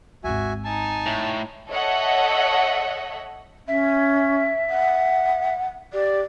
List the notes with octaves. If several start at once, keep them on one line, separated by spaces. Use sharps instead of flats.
G#1 D#2 F#4 E5 G#5
D#4 G#5 A5
A2
A4 C#5 D#5 E5 F#5
C#4 E5
F#5
G4 D5